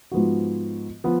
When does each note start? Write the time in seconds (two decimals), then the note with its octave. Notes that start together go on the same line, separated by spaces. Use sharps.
0.12 G#2 F3 B3 F#4
1.04 F3 B3